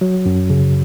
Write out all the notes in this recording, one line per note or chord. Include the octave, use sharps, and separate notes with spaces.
F#3
F#2
C#3